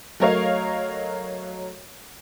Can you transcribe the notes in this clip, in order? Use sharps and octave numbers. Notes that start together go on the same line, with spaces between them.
F#3 A3 A#4 C#5 D#5 F5